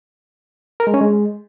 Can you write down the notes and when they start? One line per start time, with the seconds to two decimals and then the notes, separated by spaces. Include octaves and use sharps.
0.80 A#4
0.87 G#3
0.94 C#4
1.01 G#3